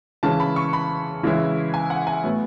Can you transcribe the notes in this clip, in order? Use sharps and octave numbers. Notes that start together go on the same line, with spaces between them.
C#3 E3 G#3 C#4 A5
B5
C#6
B5
C#3 E3 G#3 C#4 E4
G#5
F#5
G#5
A2 F#3 B3